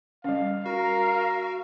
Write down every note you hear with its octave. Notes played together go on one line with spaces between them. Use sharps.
G3 C#4 F5
F#4 A#4 F5